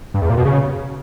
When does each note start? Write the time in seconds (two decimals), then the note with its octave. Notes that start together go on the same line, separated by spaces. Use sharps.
0.14 G2
0.22 E2
0.30 A#2
0.37 B2
0.45 C#3